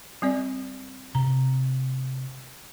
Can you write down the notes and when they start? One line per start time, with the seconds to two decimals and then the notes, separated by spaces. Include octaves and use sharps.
0.22 G3 C4 D5
1.15 C3 A#5